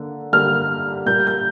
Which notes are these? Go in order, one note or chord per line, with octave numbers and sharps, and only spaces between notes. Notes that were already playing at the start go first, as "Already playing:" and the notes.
Already playing: D3 A#3
D3 G3 A#3 F6
A#2 G3 A#3 G6
G6